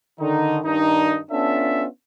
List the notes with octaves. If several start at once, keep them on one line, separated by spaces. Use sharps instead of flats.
D3 D#3 D#4
G2 D#3 D4 D#4
B3 C#4 D4 F4 A4 E5